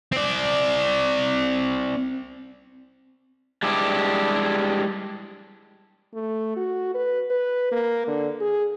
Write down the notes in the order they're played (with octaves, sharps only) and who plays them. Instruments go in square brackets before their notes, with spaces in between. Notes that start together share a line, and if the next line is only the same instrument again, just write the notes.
[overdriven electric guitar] C4 D5
[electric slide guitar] G3 G#3 D4 E4 G4
[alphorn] A3
F#4
B4
B4
A#3
D3
G#4